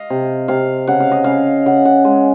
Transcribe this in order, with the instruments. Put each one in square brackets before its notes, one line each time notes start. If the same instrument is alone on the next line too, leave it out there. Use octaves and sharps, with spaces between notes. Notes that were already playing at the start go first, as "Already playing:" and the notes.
Already playing: [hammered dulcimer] D#5 F5
C3
C3 F5
C#3 F#5
F5
D#5
C#3 F5
C#3 F#5
F#5
G#3